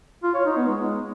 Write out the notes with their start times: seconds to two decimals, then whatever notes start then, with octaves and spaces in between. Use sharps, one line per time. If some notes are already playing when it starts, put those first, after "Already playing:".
0.23 F4
0.34 C#5
0.45 D#4
0.57 B3
0.68 G#3